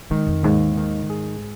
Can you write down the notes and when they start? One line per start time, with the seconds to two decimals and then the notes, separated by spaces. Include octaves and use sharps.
0.10 D#3 G#3
0.27 F2
0.43 D#2 G#2
0.77 D#3
1.10 G#4